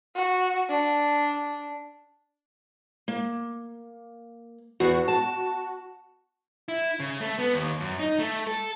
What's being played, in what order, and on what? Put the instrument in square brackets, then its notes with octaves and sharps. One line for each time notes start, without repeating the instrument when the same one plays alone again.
[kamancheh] F#4
D4
[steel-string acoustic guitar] A#3
[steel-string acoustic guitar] E2 [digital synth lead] F#4
[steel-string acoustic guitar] A5
[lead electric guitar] E4
C#3
A3
B3
D#2
F#2
D#4
A3
A4